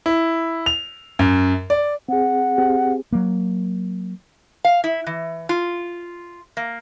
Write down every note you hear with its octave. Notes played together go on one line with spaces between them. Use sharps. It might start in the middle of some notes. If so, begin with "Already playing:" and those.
E4
F7
F#2
D5
C4 G#4 F#5
C4 G4 G#4
F#3 A#3
F5
E4
E3
F4
A#3